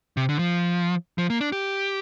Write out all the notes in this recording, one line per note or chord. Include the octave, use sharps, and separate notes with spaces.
C3
D3
F3
F3
A#3
D4
G4